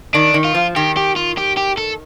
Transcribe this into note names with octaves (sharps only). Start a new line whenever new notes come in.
D#3 D4
D#3
F4
F3
D#3 G4
G4
F4
G4
G4
A4